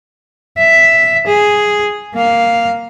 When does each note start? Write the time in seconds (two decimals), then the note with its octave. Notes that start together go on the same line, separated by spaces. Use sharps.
0.58 E5
1.27 G#4
2.15 A#3 F5